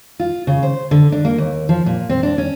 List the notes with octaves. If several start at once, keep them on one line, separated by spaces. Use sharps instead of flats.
F4
C#3
C5
D3
D4
A#3
D#2
F3
A#2
C4
D4
C#4